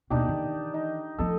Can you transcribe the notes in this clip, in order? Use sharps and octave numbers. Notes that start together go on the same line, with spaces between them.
D#2 B2 D4 D#4 G4
D#3 E3
D#4
F3 A3 A4 D#5